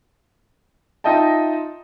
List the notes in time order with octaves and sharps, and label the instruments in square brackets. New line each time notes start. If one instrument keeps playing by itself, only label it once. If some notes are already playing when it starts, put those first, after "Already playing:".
[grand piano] D#4 F4 D#5 E5 G5 A5